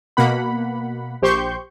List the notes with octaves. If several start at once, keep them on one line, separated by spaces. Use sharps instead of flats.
B2 A#3 F#5 B5
A#1 G4 C5 C6 C#6 G6